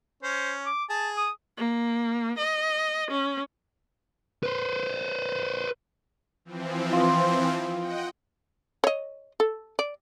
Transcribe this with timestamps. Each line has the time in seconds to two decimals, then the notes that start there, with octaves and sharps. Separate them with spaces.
0.23 C#4 C5
0.66 D6
0.90 G#4 A5
1.17 D#6
1.57 A#3
2.38 D#5
3.11 C#4
4.43 B4 C5
6.45 E3 F3 C4
6.93 F4 D#6
7.77 D#5 F#5 G5
8.84 C#5 D#5
9.40 A4
9.79 D5